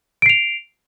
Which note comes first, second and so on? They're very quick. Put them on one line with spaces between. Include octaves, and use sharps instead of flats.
D7 C7 F7